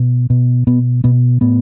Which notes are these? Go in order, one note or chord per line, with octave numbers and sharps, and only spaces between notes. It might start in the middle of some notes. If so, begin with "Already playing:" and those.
Already playing: B2
B2
B2 B3
B2 B3
A2 B3